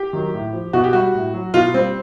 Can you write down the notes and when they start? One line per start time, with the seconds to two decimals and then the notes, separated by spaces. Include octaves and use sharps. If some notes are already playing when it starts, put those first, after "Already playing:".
Already playing: G4
0.13 D#3 F#3
0.34 A2
0.53 F3
0.73 B2 F#4
0.84 G4
0.93 G3 F#4
1.14 A2
1.33 F#3
1.54 B2 F4
1.74 G3 C4